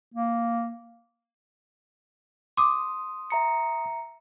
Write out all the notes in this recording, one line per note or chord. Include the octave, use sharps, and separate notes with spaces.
A#3
C6 D6 D#6
E5 A#5 C#7